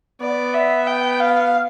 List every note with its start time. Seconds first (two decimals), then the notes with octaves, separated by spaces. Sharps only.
0.21 B3 D5
0.54 E5
0.87 G5
1.20 F5